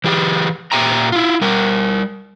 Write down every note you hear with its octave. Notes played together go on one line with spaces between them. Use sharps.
E3 G4 G#4
A#2 C4 G4 E5 G5 A#5
E4 F4
G3 A#4